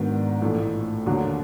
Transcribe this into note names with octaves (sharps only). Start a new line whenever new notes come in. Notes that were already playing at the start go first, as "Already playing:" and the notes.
Already playing: G#2 D#3 F#3 B3 D4
A#1 A2 E3 A3
D#2 D3 F#3